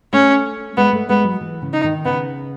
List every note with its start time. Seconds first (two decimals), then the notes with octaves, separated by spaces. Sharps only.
0.13 A3 C#4
0.77 G#3 B3
0.93 A3
1.09 G#3 B3
1.24 F#3
1.41 E3
1.62 C#3
1.73 D#4
1.84 D#3
2.05 C#3 B3